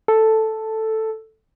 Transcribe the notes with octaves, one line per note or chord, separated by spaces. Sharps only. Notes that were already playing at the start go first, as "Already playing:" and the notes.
A4